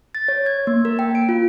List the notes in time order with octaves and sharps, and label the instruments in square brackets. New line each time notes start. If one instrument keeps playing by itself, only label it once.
[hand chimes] A6
C#5
G#6
A#3
A#4
G5
D7
F4